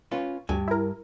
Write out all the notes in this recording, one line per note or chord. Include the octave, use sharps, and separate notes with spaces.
C#4 F4 B4
D2 G2 G#5
E4 A#4